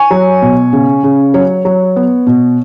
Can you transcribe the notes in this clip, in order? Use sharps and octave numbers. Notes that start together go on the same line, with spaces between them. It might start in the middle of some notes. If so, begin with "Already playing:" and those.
Already playing: G#5 C#6
F#3
B2
C#3
C#3
F#3 C#5
F#3
B3
B2